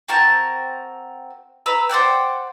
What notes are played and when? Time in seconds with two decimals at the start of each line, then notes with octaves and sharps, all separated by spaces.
0.08 C4 F#4 A#4 A5
1.66 B4 A#5 E6
1.89 C5 D5 F#5 G5